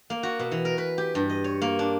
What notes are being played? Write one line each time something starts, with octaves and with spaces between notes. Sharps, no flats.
A#3
F#4
B2
E3
A#4
B4
G4
G2
D#5
C#5
A#3
D4